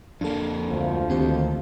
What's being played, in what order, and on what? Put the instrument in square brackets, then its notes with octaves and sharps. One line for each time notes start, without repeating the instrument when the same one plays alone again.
[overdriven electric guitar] F2 A#3 [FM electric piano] D4 A4
[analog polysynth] D2 [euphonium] F3
[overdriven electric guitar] D#2 [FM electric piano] C4 G4